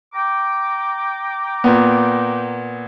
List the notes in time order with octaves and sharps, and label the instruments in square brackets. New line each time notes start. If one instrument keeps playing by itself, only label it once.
[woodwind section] G5 A#5 D6
[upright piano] A#2 B3